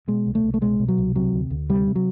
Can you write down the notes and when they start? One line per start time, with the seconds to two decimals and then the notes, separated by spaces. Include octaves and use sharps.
0.08 B2 G#3
0.26 C2
0.35 A3
0.44 C2
0.54 A3
0.61 B2 G#3
0.79 B2
0.88 F#3
0.98 C2
1.16 C3 F#3
1.33 D2
1.50 D2
1.69 C3 G3
1.87 C3
1.96 F#3